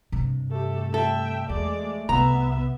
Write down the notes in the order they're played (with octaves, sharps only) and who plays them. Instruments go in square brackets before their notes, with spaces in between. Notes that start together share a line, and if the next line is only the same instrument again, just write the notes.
[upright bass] G2 C3
[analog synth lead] A3 [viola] G4 A4
[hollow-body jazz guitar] A4 [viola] E5 G5
[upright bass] E2 [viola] G#3 D5
[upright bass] C2 C3 [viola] B3 E5 [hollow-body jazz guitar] A#5